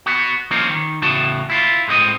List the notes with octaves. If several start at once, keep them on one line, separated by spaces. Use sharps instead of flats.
B3 F#4
F3 A#3 C4 C#4 D#4
D#3
E2 A2 C#3 F#4 A5
E4 F4
A2 G#3 C4 D#5